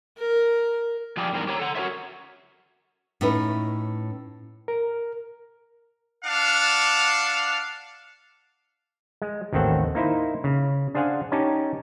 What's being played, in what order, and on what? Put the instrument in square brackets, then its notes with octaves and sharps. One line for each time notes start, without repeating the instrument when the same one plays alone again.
[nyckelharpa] A#4
[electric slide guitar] F3 G4 G#4 A#4 D5
E2 G#2 G3 C4 A#4
G4 C#5 A#5
A4 F#5
F#4 A#4 C#5 E5
[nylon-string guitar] A2 C#4 D#4 B4
[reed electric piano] A#4
[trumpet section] D4 F5 F#5
[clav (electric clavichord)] G#3
A1 D#2 D#3 C4 A4 F#5
A#3 D#4 E4 C5
C#3
D4 G#4 C5 F5 F#5 G#5
C#4 D#4 G4 G#5 A5